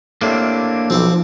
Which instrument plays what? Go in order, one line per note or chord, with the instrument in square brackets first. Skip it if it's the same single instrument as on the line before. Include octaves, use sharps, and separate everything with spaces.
[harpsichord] A2 C3 [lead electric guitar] A#3 D4
[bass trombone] B1 [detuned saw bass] F3 [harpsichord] C4 A4 D6